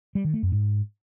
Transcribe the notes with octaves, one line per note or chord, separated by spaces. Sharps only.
G3
D#3
A3
F#2
G#2